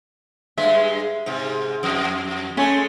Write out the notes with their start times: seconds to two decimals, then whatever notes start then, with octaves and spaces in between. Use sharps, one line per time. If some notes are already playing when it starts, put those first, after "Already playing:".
0.58 G2 G#3 E5
1.26 G#2 C3
1.83 F2
2.57 G#3 A3 C#4